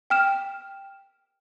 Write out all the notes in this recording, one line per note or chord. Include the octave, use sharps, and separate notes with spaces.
G5 F6 E7